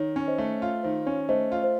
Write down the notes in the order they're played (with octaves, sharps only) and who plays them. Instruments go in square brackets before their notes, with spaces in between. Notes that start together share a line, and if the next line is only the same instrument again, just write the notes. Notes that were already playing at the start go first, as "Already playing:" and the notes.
Already playing: [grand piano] D#3 [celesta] C#5
[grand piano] C#4
[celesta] C5 D#5
[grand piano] A3
F4
[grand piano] D#3 [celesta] C5
[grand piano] C#4 [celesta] C#5
[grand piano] A3 [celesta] C5 D#5
[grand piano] F4
[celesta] C5